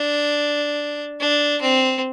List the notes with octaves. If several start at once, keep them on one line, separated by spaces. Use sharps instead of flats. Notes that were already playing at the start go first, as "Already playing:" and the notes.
Already playing: D4
D4
C4